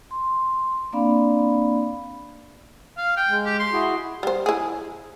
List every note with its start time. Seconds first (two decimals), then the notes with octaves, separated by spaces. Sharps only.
0.11 C6
0.93 A#3 C4 D4 D5 F5 B5
2.97 F5
3.17 G5
3.29 G#3
3.46 G4
3.59 C6
3.72 E4 F#4 G#4
4.23 G3 C5
4.46 E4 G#4